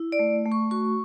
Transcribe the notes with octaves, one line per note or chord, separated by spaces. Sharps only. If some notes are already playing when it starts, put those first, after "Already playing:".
Already playing: E4
D5
A3
A3
C#6
F#4 C#6